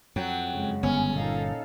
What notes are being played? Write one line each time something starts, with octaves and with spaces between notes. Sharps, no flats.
F2 F#3 G5
F#2 C#3 G#3
G1 B3 C#4
A#2 D#4 A4 F5